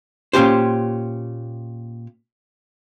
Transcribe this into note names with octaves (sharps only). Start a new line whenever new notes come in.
A#2 C#4 F#4 G4 C5